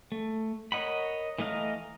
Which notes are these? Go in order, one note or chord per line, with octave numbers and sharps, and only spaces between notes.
A3
A#4 C#5 D#5 F#5 B5
E3 A3 D#5 F5 A#5